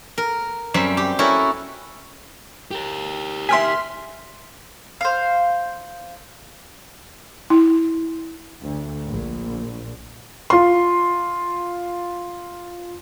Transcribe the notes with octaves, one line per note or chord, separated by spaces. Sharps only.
A#4
F#2 G3 C4 E5 B5
G4
C#4 E4 F#4 A4 A#4
G4 A#4
E5 G5 G#5 C6 F6 B6
C5 F5
E4
D2
A#1
F4 C6